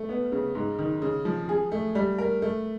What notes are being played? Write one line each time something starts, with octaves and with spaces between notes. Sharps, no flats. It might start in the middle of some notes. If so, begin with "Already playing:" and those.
Already playing: A3
B3
C#3
G#2
D#3
C#3
F3
G#4
A3
G3
A#4
A3